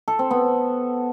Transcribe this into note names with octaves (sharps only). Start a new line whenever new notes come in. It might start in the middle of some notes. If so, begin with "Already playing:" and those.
A4
C4
B3